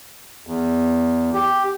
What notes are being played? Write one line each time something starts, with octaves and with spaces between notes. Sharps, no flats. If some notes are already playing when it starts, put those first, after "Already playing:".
E2
G4